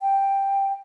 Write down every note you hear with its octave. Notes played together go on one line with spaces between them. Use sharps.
G5